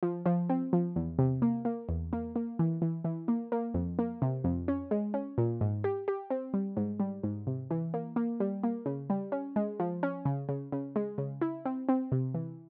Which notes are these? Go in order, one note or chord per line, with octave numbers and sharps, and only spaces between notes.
F3
F3
C4
F3
E2
C3
A#3
A#3
E2
A#3
A#3
E3
E3
E3
A#3
A#3
F2
A#3
C3
F2
C#4
G#3
C#4
A#2
G#2
G4
G4
C4
G3
G#2
G3
G#2
C3
E3
A#3
A#3
G3
A#3
C#3
G3
C#4
G#3
F3
C#4
C#3
C#3
C#3
G#3
C#3
E4
C4
C4
C3
E3